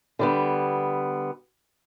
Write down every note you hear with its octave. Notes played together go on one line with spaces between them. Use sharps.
D3 G3 B3